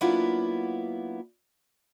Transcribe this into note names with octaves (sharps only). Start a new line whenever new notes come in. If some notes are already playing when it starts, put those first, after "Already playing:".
F#3 A#3 B3 D4 E4 F4